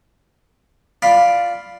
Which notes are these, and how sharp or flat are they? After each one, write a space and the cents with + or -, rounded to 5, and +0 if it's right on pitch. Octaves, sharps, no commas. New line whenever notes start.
F4 +0 D5 +0 B5 +0